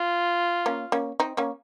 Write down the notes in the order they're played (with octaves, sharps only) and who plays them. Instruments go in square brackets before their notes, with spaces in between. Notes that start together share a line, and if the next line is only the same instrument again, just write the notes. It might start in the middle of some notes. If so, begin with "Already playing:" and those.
Already playing: [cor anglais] F4
[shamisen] A#3 C#4
A#3 C#4
C4 D#4
A#3 C#4